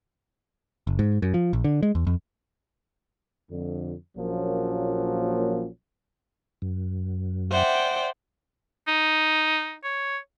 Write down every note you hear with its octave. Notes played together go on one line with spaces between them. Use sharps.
F#1
G#2
F#2
F3
A#1
D3
G#3
E2
F2
F2 D3
A#1 A#2 F3 F#3 A#3 C#4
F#2
C5 D5 E5 F#5 G5
D#4
C#5